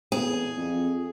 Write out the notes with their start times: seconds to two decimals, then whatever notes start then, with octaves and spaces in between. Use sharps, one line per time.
0.12 E2 G#4
0.56 F2